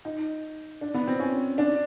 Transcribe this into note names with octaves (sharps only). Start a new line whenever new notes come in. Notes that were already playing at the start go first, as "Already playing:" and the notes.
D#4
D4
B3
C4
C#4
D4